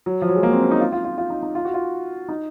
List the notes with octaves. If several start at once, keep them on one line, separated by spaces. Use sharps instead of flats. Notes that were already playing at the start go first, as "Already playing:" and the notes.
F#3
F3
F#3
G#3
A#3
C4
C#4
D#4
F4
F4
F4
F4
D#4
D#4
F4
F#4
F4
D#4